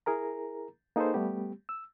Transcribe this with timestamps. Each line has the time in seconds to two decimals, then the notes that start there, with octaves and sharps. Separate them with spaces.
0.06 E4 G#4 A#4 A#5
0.96 A#3 D#4 G#4 A4 B4 C5
1.14 G3 A3 B3 G4
1.69 E6